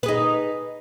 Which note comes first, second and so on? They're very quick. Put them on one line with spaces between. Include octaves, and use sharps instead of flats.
B4 G#4 D#4